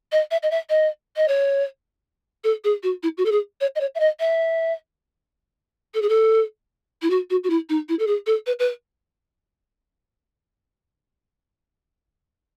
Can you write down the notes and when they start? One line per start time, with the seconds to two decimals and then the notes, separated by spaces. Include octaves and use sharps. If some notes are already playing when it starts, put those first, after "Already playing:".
0.12 D#5
0.31 E5
0.43 D#5
0.51 E5
0.70 D#5
1.17 D#5
1.28 C#5
2.44 A4
2.64 G#4
2.83 F#4
3.03 E4
3.18 F#4
3.26 A4
3.32 G#4
3.61 C#5
3.76 D#5
3.81 C#5
3.95 E5
4.00 D#5
4.20 E5
5.94 A4
6.02 G#4
6.09 A4
7.02 E4
7.10 F#4
7.30 F#4
7.44 F#4
7.50 E4
7.69 D#4
7.89 E4
7.99 A4
8.07 G#4
8.27 A4
8.47 B4
8.59 B4